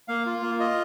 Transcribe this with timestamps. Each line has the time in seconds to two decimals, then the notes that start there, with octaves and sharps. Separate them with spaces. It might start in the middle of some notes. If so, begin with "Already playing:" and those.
0.08 A#3 F5
0.26 F4
0.42 A#3
0.59 F4 D#5